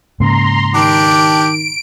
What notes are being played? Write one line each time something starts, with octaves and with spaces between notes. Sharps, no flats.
G#2 C#3 A#3 A#5 C6
D#3 D4 G4 D7